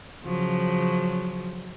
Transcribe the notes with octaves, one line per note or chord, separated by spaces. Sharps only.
C#3 F3 F#3